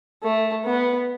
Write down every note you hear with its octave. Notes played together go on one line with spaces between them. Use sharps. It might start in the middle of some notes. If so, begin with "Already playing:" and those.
A3
B3